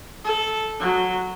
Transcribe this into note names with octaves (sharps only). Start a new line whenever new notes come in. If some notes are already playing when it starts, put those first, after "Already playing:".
A4
F#3